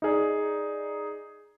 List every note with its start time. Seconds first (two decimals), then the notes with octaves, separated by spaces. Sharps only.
0.02 D#4 G#4 D5